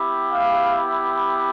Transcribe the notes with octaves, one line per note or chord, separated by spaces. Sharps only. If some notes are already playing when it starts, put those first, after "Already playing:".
Already playing: B3 E4 G4
F5